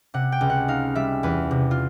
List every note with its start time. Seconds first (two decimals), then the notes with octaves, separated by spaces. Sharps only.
0.14 C3 F#5
0.32 G5
0.41 C#2
0.50 F#5
0.68 D#4 F5
0.95 G3 E5
1.23 E2 B4
1.51 C3
1.71 F4